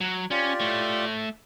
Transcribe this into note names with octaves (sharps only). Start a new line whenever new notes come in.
F#3
C#4 F4 G4 D5
A3 C#5